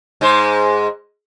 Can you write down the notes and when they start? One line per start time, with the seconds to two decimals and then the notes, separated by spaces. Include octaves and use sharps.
0.21 G#2 G#3 C5